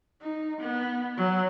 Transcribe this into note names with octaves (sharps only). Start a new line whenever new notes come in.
D#4
B3
F#3